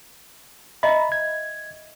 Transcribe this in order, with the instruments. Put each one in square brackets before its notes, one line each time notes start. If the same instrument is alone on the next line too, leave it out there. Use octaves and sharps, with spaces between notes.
[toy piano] D#5 E5 [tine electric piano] A#5 B5
[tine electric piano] G#6